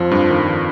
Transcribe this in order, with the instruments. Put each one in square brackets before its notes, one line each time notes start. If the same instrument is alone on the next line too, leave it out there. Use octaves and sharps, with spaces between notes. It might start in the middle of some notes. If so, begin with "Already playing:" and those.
Already playing: [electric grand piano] F2 [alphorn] F3
[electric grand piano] G2
D#3